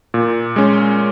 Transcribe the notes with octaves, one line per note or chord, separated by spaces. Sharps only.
A#2
G#3 C#4